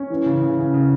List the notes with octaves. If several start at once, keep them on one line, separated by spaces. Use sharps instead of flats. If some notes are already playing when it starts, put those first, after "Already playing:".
Already playing: C#4
E3
C#3
C#3
C#3
C#3